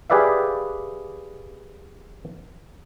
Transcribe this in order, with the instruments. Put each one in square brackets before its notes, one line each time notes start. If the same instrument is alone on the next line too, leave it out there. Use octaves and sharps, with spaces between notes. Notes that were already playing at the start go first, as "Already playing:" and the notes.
[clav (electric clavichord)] G4 G#4 B4 D5 E5 F5